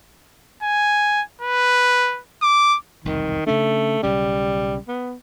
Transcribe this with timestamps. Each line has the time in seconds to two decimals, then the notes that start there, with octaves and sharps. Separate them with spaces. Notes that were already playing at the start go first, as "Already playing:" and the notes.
0.63 G#5
1.41 B4
2.42 D6
3.05 E1 C2 F2 D#3
3.47 C#3 A3 C#4 D4
4.03 B1 C#3 G3 C#4
4.88 B3